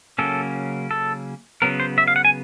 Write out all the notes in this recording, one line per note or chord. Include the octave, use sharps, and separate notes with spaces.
C#3 F#3 A#3 C#4 A4
A4
C#3 F#3 B3 A#4
C5
E5
F5
F#5
G#5